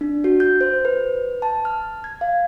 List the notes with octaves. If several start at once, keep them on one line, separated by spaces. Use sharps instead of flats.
D4
F#4
G6
C5
B4
A5
F6
G#6
F5